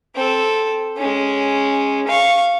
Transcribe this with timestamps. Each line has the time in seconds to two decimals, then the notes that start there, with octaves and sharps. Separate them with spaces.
0.15 C4 A4
0.97 G#3 C#4
2.07 F5 C#6